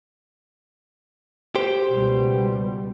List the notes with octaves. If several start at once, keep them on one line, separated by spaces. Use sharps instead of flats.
G4 C5
C#2 B2 G3